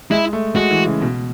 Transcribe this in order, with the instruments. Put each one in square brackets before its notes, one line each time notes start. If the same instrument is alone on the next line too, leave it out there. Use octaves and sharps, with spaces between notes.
[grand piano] G#3 [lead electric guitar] E4
[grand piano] A3
[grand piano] G#3 [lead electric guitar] F#4
[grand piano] E3
C#3
B2